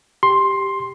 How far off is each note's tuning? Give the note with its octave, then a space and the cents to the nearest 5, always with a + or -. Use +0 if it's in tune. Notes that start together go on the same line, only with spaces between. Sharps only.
G4 +0 C6 +10